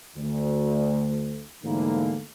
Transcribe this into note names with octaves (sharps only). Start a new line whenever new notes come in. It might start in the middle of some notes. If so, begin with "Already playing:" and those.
D2
D2 G#2 D3 E3 A#3